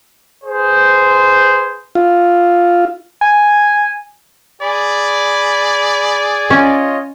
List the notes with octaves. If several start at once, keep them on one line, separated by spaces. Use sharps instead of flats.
G#4 B4 C5
F4
G#5
G#4 D5 B5
C#4 F4 C#5 D#5